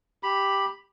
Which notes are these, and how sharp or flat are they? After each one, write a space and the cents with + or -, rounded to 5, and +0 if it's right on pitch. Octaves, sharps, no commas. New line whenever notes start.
G4 +0 B5 +0